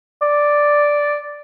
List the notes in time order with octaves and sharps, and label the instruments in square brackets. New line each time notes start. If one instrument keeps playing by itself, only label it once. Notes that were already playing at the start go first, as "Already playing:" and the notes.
[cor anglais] D5